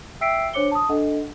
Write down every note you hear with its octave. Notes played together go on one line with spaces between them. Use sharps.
E5 G5 E6 B6 C7 D7
D4 C5 C#5 D6 C#7 G7
A5 D#6
D4 A4 D#5 F#5